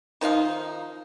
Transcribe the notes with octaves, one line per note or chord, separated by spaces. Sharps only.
D#3 F3 D#4 F5